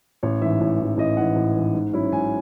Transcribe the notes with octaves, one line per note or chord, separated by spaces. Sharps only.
A1 C#5
G#2 E3 E5
A1
G#2 E3
A1 D#5
G#2 E3 F#5
A1
G#2 E3
G#2
F#3 C#4 E4
G#2 G#5